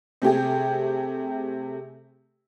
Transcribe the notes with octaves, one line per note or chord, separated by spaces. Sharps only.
C3 A3 G4 G#4